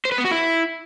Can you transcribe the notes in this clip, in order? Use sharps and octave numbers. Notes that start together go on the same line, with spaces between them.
C5
B4
B3
F#4
E4